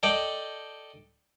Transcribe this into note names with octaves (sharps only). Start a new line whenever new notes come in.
A4 D5 D#5 G5